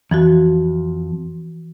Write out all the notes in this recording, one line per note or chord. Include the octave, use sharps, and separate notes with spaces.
F2 E3 F3 F#4